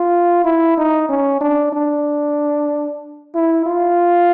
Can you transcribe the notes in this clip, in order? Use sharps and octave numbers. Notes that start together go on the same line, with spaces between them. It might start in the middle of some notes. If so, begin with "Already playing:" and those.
Already playing: F4
E4
D#4
C#4
D4
D4
E4
F4